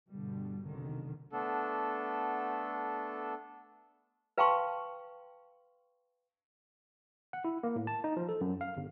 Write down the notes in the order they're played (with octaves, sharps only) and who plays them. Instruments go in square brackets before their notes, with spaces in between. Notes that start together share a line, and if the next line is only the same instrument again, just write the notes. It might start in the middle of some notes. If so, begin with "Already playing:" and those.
[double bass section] G2 B2 D3 G3
F1 B1 D3 D#3
[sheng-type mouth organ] A3 B3 D4 A4
[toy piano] B4 F5 G5 A5 C6 C#6
[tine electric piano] F#5
E4
A#3
A2
A5
D#4
F3
A4
F#2
F5
G1